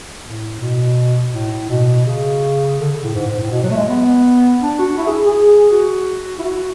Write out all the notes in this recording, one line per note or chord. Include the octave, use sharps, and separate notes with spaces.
A2
B2
A2
A2
B2
C#3
D3
C#3
A2
G#2
G#2
A2
B2
F#3
A3
G#3
B3
D4
F#4
E4
G#4
G#4
F#4
E4
F#4